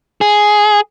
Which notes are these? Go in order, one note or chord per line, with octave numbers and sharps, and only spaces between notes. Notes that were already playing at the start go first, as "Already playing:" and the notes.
G#4